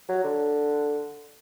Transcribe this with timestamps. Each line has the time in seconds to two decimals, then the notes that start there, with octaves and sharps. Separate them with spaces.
0.09 F#3
0.24 D3